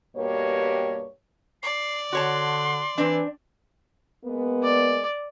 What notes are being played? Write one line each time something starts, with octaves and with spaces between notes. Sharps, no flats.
G2 B2 A#3 G4 C#5
D5 C7
D3 F#4 C#5 A5 C6
E3 C4 D4
G#3 A#3 B3
D5